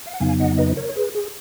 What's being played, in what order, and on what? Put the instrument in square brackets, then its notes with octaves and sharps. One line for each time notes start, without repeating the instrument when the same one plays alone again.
[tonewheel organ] F5
F#5
F2 C#3 F#3 B3 D#4 F5 G#5
D#5 F#5
B4 D#5
A#4 C#5
C#5
G#4 B4
G#4